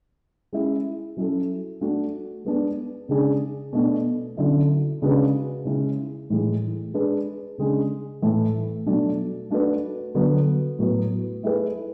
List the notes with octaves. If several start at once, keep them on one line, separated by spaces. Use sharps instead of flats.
G#3 C#4 E4
F#3 C#4 E4 A4
A3 D4 F#4
G#3 B3 D4
C#3 G#3 D4 G#4
B2 A3 D4
D3 F#3 C#4 E4
C#3 G#3 D4 F#4 B4
C#3 G#3 C#4 E4
A2 E3 G#3
G#3 D4 G#4 B4
C#3 G#3 D4
A2 E3 A3 E4
B2 F#3 A3 D4
A3 D4 F#4 B4
D3 F#3 B3
A2 F#3 B3
A3 E4 G#4 B4